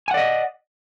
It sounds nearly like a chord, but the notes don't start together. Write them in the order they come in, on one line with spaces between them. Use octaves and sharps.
G#5 F#5 D5 D#5